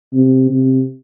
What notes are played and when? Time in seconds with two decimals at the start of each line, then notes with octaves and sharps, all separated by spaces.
0.14 C3
0.50 C3